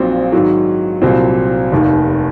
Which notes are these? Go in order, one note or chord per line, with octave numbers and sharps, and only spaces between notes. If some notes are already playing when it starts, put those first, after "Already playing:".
Already playing: A#1 A#2 F#3 C4 D#4
G#2 D#3 F#3
C2 A#2 F#3 C4
F1 D#2 D#3